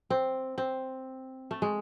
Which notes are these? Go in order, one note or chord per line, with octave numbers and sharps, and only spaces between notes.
C4
C4
A3
G#3